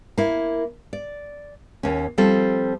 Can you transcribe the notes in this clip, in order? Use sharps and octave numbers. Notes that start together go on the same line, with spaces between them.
A#3 E4
D5
D#2 C#4
F3 G3 C4 F4 A4